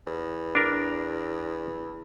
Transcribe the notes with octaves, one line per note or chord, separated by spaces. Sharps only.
E2
D4 A#4